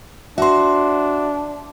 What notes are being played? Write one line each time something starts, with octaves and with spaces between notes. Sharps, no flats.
D4 F#4 C5 E5 C6